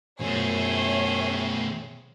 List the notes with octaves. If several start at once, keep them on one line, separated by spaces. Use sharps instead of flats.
F#2 B2 A3 G#4 C5 C#5 E5